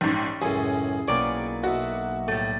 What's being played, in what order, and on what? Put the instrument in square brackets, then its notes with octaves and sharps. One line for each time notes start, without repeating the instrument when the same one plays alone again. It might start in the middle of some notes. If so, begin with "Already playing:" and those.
[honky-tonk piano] A#1 G#2 [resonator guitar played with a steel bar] G3 C#4
[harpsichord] C#2 F#2 A2 [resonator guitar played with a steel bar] C#4 [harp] E4 [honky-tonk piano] G#4
[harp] B1 A#3 [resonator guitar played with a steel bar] B3 D5 [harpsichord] C#5 G5 A5
[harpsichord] B1 [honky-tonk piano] F#4 [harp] D#5 E5
[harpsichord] A2 [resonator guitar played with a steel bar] G3 A3